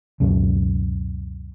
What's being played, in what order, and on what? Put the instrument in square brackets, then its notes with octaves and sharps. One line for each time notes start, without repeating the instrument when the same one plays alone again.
[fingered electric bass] C#2 F#2 B2